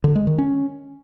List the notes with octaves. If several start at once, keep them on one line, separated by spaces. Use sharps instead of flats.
D3
G#3
D#3
C#4